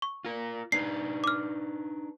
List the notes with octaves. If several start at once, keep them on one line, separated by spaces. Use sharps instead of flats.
C#6
F4 A#4
D4 D#4 B4 C7
D6 F6